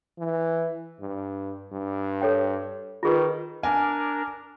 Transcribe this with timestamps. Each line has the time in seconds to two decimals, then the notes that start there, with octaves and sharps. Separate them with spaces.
0.19 E3
1.00 G2
1.72 G2
2.22 A4 C#5 G5
3.03 D#3 F4 G#4 B4
3.63 D4 A#4 G#5